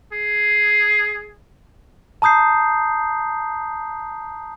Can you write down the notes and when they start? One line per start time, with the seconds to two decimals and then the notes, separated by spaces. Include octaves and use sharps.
0.12 G#4
2.22 A5 A#5 D#6 G6 C7